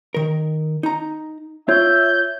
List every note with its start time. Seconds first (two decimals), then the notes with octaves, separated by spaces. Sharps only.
0.15 D#3 A#4
0.83 D#4 A#5
1.69 F4 C#5 E5 G6